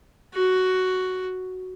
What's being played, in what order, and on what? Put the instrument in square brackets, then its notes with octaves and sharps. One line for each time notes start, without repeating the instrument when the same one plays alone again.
[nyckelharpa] F#4